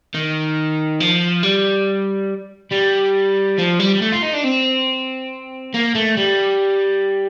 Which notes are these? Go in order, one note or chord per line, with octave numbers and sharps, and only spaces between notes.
D#3
F3
G3
G3
F3
G3
G3
A3
F4
D#4
D4
C4
A#3
A3
G3